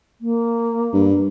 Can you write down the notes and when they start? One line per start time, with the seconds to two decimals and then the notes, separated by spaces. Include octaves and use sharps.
0.21 A#3
0.93 G2